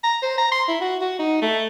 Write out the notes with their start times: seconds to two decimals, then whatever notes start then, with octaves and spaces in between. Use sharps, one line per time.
0.04 A#5
0.22 C5
0.38 A#5
0.52 C6
0.68 E4
0.81 F#4
1.01 F#4
1.19 D#4
1.42 A3